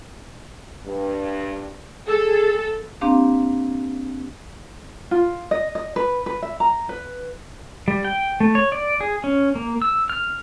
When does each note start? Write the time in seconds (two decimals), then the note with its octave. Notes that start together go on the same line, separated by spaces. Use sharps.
0.86 G2
2.08 G#4 A4
3.01 A#3 C4 D4 G4 F5
5.11 F4
5.51 D#5
5.75 D#5
5.96 B4
6.26 B4
6.42 E5
6.60 A#5
6.89 B4
7.88 G3
8.04 G5
8.40 A3
8.55 C#5
8.72 D5
9.01 G#4
9.24 C#4
9.55 A#3
9.82 E6
10.09 F6